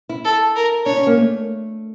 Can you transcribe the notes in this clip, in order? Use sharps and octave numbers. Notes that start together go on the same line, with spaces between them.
E4
A4
A#4
D4 C#5
C#4
A#3
A3